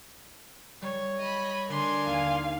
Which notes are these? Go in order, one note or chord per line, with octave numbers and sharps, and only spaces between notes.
G3 C#5
D#5 B5
D3 D4 A#4 G#5 C6
D#2 F5